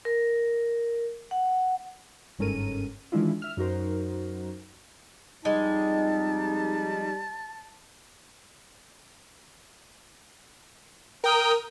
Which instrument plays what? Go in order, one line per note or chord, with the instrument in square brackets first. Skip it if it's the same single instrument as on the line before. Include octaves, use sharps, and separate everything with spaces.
[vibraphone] A#4
F#5
[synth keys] G1 G#2 C#4 A4 A#4 D#7
D#3 E3 G#3 D4 E4 F4
E5 F6
F#2 D#4 F#4 A#4 C5
[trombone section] F2 D#4 [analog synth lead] G3 [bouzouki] G#3 [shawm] A5
[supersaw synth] A#4 D#6 [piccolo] G5